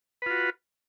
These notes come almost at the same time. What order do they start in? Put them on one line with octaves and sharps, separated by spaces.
B4 F4 F#4